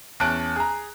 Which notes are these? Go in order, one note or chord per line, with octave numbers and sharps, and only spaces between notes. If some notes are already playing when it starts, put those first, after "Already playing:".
E2 C#4 A5 F#6 D7
G#4 A#5